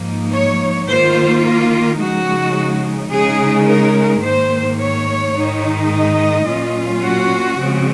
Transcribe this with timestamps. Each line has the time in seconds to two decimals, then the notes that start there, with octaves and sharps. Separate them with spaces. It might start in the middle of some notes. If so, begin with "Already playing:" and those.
Already playing: G#2 F3 A#3 D#4
0.32 C#5
0.87 D#3 A#3 F4 C5
1.43 A#4
1.99 C#3 F3 G#3 D#4 F#4
3.11 C#3 G#3 D#4 G#4
3.66 A#4
4.22 G#2 D#3 A#3 C5
4.79 C#5
5.35 G#2 D#3 G#3 D#4
5.91 D#5
6.46 A#2 F#3 C#4 F4
7.02 F#4
7.58 C#3 F3 G#3 C4